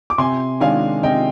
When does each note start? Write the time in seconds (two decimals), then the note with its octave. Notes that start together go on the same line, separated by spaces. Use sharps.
0.10 D6
0.18 C3 G#5 C6
0.60 D#3 G#3 D4 F5 G#5
1.03 C3 D#5 G5